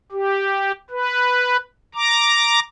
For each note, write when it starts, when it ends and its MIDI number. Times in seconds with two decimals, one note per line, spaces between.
0.12 0.72 67
0.90 1.57 71
1.94 2.60 82
1.94 2.60 86